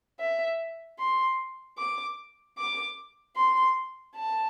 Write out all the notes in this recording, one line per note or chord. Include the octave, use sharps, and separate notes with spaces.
E5
C6
D6
D6
C6
A5